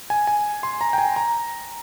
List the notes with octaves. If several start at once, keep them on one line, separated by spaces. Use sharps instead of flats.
G#5
G#5
C6
A#5
G5
G#5
A#5